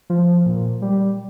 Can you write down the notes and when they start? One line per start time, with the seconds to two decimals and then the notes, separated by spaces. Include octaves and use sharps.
0.10 F3
0.46 A#2
0.82 G3